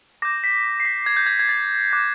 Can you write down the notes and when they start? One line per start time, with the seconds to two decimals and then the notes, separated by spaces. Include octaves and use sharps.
0.22 D6 G6 A#6
0.44 B6
0.80 C7
0.85 B6
1.06 G#6
1.17 G6
1.26 G#6
1.39 G#6
1.49 A6
1.91 D6 F#6 A#6